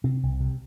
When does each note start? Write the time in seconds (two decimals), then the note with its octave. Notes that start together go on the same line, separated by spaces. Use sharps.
0.04 C3 C4
0.23 C2
0.40 C3